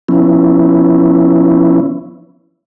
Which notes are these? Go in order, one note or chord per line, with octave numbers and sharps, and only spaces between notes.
F3 B3 C#4 E4